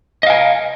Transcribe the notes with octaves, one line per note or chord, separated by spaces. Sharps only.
D#5 F5 G#5